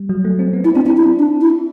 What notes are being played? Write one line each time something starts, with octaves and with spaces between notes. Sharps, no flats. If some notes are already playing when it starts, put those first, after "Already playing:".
Already playing: G3
F#3
A3
C4
B3
C4 E4
C4 D4
D4 E4
E4
D4
E4